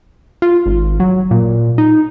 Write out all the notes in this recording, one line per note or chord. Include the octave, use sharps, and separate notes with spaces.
F4
G#1
F#3
A#2
D#4